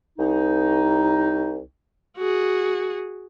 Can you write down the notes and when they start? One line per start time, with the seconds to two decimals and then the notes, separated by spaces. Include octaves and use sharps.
0.19 C2 D#4
2.17 F#4 G#4